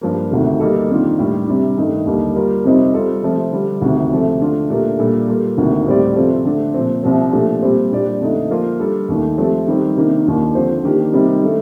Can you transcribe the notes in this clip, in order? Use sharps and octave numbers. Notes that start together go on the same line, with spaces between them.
G2 F3 A#3
D2 C3 D#3 A3
G3 A#3 D#4 A4
F2 D#3 A#3 D4 F4
A2 G3 D4 G4
C3 G3 D4
G2 D#3 A3 D#4
D#2 D3 G3 A#3 D#4
G3 A#3 F4 A#4
F2 C3 G3 C4 D#4
G3 C4 F4 A4
C3 F3 A3 C4
D3 G3 D4
D2 C3 D#3
C3 F3 A3
D3 A3 D4 F4
A#2 A3 D4 G4 A#4
A#2 G3 D4 A4
G3 A#3 F4 A4
D2 C3 D#3 A#3 D4
A2 G3 C4 G4 D5
C3 F3 C4 F4 A4
D3 A3 D4
A#2 F3 C4
C2 C3 F3 C4
A#2 F3 A3 D4 G4
A#2 G3 C4 G4
A#2 G3 D4 G4 D5
F2 D3 A3 D#4
F3 A#3 F4 A#4
G3 D4 A4
D#2 D#3 A3
F3 A3 C4 G4
D#3 G3 C4
C3 D#3 A#3 D4
D#2 D#3 A#3 D4 F4
D3 F3 C4 F4 C5
D#3 A#3 D4 G4
C3 D#3 G3 C4 D#4
D#3 A3 D4 A4